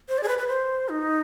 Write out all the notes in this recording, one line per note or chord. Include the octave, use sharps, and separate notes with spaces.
C5
D5
G#4
B4
B4
C5
D#4